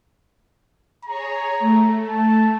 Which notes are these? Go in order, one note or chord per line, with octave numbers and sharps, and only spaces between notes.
G#4 C#5 A#5
A3
A5